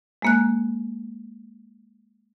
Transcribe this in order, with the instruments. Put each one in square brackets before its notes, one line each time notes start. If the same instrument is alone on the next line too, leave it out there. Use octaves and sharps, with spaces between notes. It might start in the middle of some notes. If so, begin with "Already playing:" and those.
[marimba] G#3 A#3 F#6